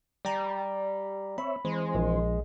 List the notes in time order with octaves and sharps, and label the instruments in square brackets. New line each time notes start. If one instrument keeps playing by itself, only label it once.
[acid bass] G3 [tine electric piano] D5 G5 A#5
[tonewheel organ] C4 C#5 E5 [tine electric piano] B5
[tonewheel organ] E3 C4 C5 [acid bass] G#3
[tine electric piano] A#1